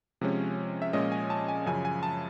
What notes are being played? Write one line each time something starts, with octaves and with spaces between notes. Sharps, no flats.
C3 F3 G#3 C#4
E5
A#2 F3 G#3 C#4 D#5
G#5
A5
G#5
F#2 C#3 F3 G#5
G#5
A5